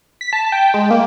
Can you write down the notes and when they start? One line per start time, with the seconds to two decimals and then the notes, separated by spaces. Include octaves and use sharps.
0.21 B6
0.33 A5
0.52 G5
0.74 G#3
0.91 A#3